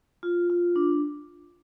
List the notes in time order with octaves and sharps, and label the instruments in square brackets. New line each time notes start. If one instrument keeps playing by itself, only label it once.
[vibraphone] F4
F4
D4